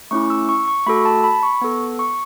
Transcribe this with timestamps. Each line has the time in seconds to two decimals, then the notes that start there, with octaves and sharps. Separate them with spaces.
0.11 A3 C#4 E4 C#6
0.30 E6
0.49 C#6
0.68 C#6
0.86 A3 F#4 A4 B5
1.05 A5
1.24 B5
1.43 C#6
1.61 B3 A4
1.99 C#6